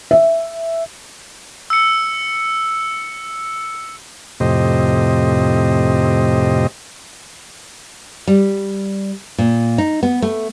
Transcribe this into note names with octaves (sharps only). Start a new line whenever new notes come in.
E5
E6 C#7
F2 A2 C3 G4 C5 D#5
G3
A#2
D#4
B3
A3